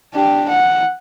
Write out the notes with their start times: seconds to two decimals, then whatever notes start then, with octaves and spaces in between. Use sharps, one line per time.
0.13 D4 G4
0.49 F#5